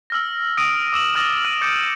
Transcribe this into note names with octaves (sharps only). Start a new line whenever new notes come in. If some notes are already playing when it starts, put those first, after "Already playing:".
E6 F6 A#6
D#6 A#6 D7 D#7
D6 E6 E7 F#7
D#6 F6 A6 A#6 E7 F#7
F6 D#7
D6 G6 A6 C#7 D7